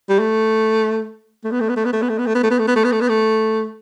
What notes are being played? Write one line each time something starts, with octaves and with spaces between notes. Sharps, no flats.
G3
A3
A3
B3
A3
B3
A3
B3
A3
B3
A3
B3
A3
B3
A3
B3
A3
B3
A3
B3
A3
B3
A3